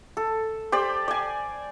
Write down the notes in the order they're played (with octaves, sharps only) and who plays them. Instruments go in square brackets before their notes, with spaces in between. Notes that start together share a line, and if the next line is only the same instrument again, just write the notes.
[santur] A4
G4 C5 D5
D5 G#5